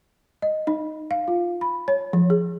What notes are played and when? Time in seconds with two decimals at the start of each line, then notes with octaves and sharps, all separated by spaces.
0.42 D#5
0.67 D#4
1.11 F5
1.28 F4
1.61 B5
1.88 C#5
2.13 F3
2.30 G#4